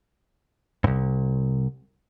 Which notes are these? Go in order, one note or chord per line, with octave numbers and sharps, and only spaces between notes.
C2 G2